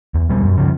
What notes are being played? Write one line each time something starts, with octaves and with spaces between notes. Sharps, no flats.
E2
B2 G3
F#2
C#3 F3